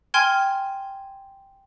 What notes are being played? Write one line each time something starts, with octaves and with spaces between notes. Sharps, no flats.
G5 G#5 C6 F6 G#6